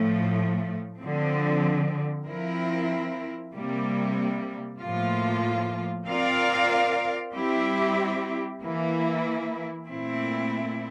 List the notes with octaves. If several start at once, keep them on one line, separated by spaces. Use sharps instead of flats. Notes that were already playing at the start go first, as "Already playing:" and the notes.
Already playing: A2 F3 A3
D3 F3 C4
F3 C4 E4 A#4
C3 G3 A#3
A2 F3 A#3 F4
C4 F4 A#4 D5 F5
G3 C4 E4 G4
E3 A#3 E4
A#2 A3 C4 E4